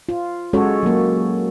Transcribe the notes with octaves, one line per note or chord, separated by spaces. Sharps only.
F4
G#3 C#4 F#4 A4 C#5
F#3 A#3